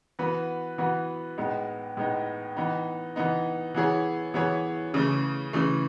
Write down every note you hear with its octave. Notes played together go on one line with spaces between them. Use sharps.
E3 B3 F#4 B4
E3 B3 F#4 B4
A2 G#3 B3 D#4
A2 G#3 B3 D#4
E3 B3 D#4
E3 B3 D#4
E3 B3 E4 G#4 C#5
E3 B3 E4 G#4 C#5
C#3 E3 A3
C#3 E3 A3